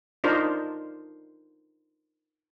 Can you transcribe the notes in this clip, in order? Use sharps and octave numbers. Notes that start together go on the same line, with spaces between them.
D4 D#4 F4 A#4 C5